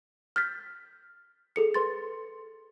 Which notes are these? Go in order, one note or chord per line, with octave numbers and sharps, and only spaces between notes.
F6 G6 A6 B6
G#4 A4 C#7
B4 C6 A6